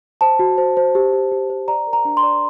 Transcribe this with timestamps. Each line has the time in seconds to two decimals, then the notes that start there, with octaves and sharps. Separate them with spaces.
0.21 C5 A5
0.39 F#4
0.58 C5
0.77 C5
0.95 G4
1.13 G4
1.32 G4
1.50 C5
1.68 D5 A#5
1.87 A#4
1.93 A#5
2.05 D4
2.17 C6
2.23 D5